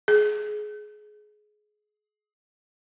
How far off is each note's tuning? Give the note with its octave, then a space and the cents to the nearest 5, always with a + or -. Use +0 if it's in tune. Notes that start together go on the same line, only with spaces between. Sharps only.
G#4 +20